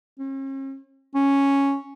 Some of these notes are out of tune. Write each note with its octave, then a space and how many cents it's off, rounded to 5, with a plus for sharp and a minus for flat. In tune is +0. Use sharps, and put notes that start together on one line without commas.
C#4 -45
C#4 +0